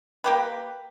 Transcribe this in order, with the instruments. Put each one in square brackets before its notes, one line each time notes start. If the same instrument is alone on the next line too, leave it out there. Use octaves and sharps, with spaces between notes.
[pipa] A#3 G4 B4